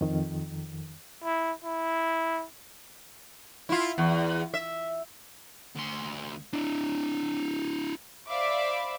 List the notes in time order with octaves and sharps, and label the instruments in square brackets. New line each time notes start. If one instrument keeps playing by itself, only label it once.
[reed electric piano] F2 D#3
[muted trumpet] E4
E4
[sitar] E4 F4
E2
E5
[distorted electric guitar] D2 C6
D4 E4
[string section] C5 D5 E5 F5 B5 D6